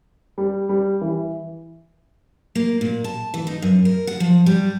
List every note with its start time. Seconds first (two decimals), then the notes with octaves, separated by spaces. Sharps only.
0.38 G3
0.69 G3
1.01 E3
2.55 A#3
2.81 A#2
3.04 A5
3.34 E3
3.47 D#4
3.62 F#2
3.85 A#4
4.07 F#5
4.20 F3
4.46 G3